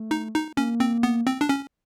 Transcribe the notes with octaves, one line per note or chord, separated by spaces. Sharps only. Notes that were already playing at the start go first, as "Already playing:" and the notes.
Already playing: A3
D#4
D#4
A#3 C#4
C4
B3
C4
D4
C#4